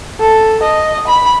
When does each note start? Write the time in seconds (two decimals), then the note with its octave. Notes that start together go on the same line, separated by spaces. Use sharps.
0.20 A4
0.63 D#5
1.08 B5